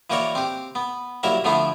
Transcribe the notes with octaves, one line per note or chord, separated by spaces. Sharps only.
E3 A#3 F#4 A#4 C#5 D5
C4 G4
B3
C2 F#3 A#3 E4 A#4 E5
D3 F3 A3 B3 D4 E4